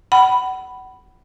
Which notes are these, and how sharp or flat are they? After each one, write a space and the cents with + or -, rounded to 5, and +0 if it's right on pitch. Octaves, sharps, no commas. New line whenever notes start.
F#5 +30 B5 +0